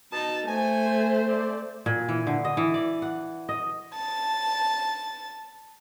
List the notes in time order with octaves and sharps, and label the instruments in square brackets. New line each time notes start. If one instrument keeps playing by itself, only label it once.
[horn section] B2 D#4 [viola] A5
[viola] A3 C5 [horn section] G#5
[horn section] C4 D5
[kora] A#2
E3
D3
D#5
E3
D5
F#5
D#5
[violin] A5 A6